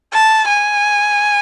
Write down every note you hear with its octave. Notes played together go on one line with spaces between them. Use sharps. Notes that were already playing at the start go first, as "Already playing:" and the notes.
A5
G#5